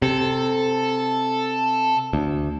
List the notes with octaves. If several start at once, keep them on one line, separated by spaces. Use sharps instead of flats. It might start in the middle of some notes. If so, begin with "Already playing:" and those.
C3 A4
D2